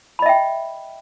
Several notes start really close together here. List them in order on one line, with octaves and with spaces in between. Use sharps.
B5 D#5 E5 G5